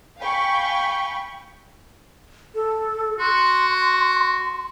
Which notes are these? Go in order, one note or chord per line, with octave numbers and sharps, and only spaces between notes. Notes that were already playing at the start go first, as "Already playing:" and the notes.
F5 G5 G#5 B5 C#6
A4
F#4 C6